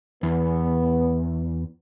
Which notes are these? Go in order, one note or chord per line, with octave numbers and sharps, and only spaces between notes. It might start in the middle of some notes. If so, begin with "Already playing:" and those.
E2 B3